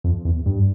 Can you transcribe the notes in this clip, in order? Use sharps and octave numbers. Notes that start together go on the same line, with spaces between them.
F2
E2
G2